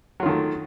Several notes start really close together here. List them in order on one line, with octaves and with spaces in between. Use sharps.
F#3 F4 D#3 A3